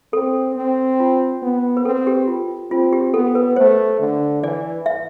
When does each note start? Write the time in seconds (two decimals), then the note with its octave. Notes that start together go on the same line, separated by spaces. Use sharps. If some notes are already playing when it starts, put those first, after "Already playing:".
0.13 C4 A4
0.56 C4
1.00 F4
1.42 B3
1.77 B4
1.85 C4 A4
2.07 G4
2.28 F4
2.71 C4 F4
2.93 G4
3.14 B3 A4
3.35 B4
3.56 A3 C5
4.00 D3
4.43 E3 D5
4.86 E5